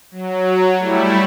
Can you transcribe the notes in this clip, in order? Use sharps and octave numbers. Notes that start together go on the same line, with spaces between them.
F#3
G3 A3 E4